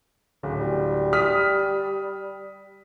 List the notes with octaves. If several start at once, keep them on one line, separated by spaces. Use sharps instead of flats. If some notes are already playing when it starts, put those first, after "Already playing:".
D1 C#3
G3
D#6 F6 B6